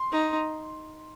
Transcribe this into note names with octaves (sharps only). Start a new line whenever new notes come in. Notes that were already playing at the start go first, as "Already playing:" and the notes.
Already playing: C6
D#4